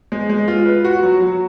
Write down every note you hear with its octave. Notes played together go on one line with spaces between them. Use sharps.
G#3
G#3
F4
B4
F#4
F#3
F#3